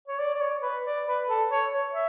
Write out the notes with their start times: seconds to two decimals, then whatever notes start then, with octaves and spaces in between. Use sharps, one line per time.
0.08 C#5
0.19 D5
0.34 D5
0.41 C#5
0.62 B4
0.85 D5
1.07 B4
1.28 A4
1.50 C#5
1.72 C#5
1.93 E5